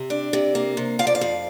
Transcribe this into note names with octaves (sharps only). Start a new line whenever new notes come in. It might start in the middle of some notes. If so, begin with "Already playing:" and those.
Already playing: C3
D4
C3
A#3
C3
F3 F5
D5
F5
F2